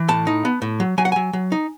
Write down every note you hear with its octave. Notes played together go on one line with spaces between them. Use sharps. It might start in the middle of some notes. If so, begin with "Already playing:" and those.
Already playing: E3
A2 A5
D#4
B3
A2
F#3
F#3 G#5
F#5
F#3 G#5
F#3
D#4